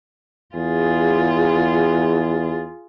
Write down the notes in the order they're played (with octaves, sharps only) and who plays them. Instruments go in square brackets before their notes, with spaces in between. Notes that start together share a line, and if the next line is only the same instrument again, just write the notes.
[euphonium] E2 [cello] F4 G#4